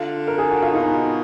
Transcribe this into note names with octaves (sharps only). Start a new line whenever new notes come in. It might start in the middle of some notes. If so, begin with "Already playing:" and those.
Already playing: D3 F4
A#4
G#4
F#4
F4
B2 D#4